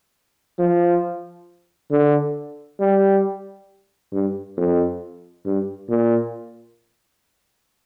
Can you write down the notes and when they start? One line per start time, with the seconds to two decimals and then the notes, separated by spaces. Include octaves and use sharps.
0.59 F3
1.91 D3
2.80 G3
4.13 G2
4.57 F2
5.45 G2
5.89 A#2